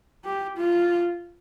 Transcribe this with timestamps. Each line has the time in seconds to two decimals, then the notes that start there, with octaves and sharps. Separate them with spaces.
0.25 G4
0.57 F4